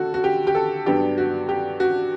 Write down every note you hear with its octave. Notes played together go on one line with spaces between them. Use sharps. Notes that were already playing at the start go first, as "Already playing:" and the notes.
Already playing: D2 D3 F#4 A4
F#4
G4
G4
A4
G2 F#3 B3 D4 G4
F#4
G4
F#4